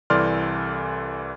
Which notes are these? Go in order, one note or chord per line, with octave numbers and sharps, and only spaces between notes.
C2 E3 A4 D5 C6 F6